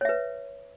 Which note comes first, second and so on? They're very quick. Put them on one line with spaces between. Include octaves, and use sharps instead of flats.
C#5 E5 B4